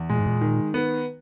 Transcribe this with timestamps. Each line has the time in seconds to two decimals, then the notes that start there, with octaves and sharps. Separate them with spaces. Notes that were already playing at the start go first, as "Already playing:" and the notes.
Already playing: E2
0.09 A#2 G#3
0.18 G#2
0.27 A#2
0.41 D#3
0.74 B3